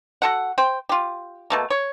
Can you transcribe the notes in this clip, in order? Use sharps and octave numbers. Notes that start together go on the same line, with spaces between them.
F#4 A4 F#5
C5 G5
F4 G4
B2 A3 A#3
C#5